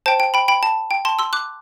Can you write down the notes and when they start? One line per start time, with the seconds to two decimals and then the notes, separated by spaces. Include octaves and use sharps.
0.06 C5 G5 A5
0.20 G5
0.34 G5 B5
0.48 G5 B5
0.63 A5
0.91 G5
1.05 A5 C6
1.19 C6 E6
1.33 D6 F#6